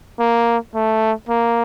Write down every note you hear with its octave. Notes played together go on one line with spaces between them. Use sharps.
A#3
A3
A#3